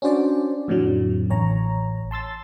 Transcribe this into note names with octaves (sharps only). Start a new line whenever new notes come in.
C#4 D4 F#4 C5 D5
F2 A2 D3 F#3
A1 C#5 A#5
A5 C6 E6 A6